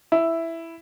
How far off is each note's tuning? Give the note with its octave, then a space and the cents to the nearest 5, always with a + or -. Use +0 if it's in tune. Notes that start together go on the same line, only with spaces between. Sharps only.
E4 +5